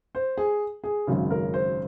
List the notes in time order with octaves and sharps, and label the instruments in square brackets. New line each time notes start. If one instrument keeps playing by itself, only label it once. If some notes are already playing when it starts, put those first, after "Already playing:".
[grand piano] C5
G#4
G#4
G#1 F#2 C#3
A#4
C5